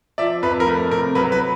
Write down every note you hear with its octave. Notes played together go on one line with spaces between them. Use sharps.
F3 D5 E5
F2 B4
A#4
A3 B4
C3 A#4
F#3 B4
B4